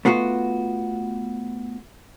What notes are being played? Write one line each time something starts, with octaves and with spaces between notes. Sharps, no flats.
A3 B3 F4 F#4